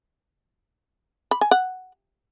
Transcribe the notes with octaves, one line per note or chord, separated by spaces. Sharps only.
B5
G#5
F#5